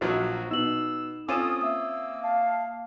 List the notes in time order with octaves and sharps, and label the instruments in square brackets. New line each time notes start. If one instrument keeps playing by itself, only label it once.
[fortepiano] A#1 F3 F#3 [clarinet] F#4
[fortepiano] B2 [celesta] D#4 F#7 [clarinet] E6
[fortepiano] C4 C#4 F4 [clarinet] A4 [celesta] D6 D#7 E7 [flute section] D#6
[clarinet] A#3 [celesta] E5 D#6 [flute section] E6
[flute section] F5 A5